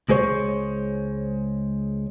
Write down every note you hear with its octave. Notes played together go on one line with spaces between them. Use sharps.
C#2 G#3 G#4 C5 C#5